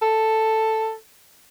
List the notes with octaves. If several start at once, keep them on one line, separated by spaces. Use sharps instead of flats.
A4